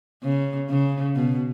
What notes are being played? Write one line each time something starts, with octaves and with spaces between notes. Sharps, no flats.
C#3
C#3
B2